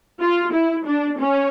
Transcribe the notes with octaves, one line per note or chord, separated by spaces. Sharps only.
F4
E4
D4
C#4